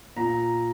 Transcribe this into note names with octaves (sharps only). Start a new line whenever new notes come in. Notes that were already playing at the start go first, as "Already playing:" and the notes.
A#2 A#5